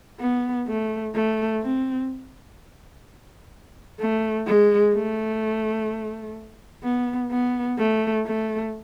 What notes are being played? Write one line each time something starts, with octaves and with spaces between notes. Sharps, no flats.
B3
A3
A3
C4
A3
G#3
A3
B3
B3
A3
A3